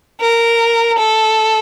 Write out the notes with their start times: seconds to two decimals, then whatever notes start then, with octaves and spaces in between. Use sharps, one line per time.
0.21 A#4
0.98 A4